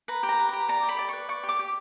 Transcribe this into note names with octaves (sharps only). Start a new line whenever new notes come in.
B4 A#5
G4
A#5
B4
G4 A#5
D5 A#5
G4
B5
D5
B4 C#6
D5 C#6
G4
D6
G4